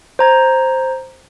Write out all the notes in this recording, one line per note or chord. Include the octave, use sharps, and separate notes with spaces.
C5 A#5 G#6